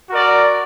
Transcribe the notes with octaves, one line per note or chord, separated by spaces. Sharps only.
F#4 A#4 D5